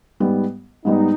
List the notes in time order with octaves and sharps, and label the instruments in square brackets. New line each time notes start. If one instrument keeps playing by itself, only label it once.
[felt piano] G#2 G3 B3
[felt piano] G#2 G3 B3 [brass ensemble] D#4